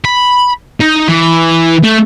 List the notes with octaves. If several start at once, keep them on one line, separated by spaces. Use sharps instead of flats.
B5
D#4
E3
A3